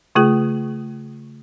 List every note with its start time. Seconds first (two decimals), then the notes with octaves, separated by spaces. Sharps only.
0.15 C#3 A3 F4 G#4